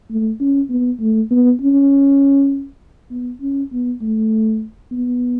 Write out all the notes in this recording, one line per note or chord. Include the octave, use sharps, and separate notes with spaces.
A3
C#4
B3
A3
B3
C#4
B3
C#4
B3
A3
B3